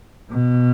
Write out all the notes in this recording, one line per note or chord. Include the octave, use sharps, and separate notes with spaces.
B2